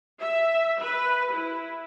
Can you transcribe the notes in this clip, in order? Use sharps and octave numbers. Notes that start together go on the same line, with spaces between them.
E5
B4
E4